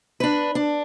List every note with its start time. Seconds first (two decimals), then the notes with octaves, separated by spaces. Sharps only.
0.20 D4 B4
0.55 D4